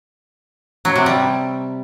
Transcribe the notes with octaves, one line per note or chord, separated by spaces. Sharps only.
F#3
C3
G3